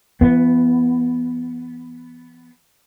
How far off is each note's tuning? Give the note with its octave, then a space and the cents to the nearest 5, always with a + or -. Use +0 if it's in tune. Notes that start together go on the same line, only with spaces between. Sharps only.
E3 +35 B3 +0